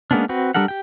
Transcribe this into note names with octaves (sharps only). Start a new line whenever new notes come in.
G#3 A#3 B3 C#4 D4
C4 F#4 B4
G3 D4 A4 A#4 F#5
G4 G5